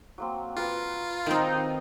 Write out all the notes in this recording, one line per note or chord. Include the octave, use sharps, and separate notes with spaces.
F#3 A#3 C4
F4 F#4 A#4 B4
D#3 C4 D#4